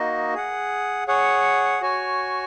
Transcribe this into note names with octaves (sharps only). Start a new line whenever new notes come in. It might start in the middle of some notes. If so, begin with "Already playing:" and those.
Already playing: A#3 D#4 F#4 D#5
G#4 F#5
G#4 C#5 F#5
F#4 C#5 G#5